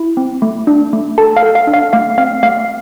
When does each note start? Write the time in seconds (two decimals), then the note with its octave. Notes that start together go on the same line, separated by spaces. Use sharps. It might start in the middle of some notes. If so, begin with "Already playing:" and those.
Already playing: E4
0.17 C4
0.42 A3
0.67 D4
0.93 A3
1.18 A4 A5
1.37 F5
1.43 A4
1.55 F5
1.67 D4
1.74 F5
1.93 A3 F5
2.18 C4 F5
2.43 A3 F5